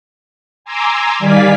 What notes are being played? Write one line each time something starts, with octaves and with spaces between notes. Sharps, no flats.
G#5 A#5 C6 D6 E6
D#3 G3 D5 F5 G#5 B6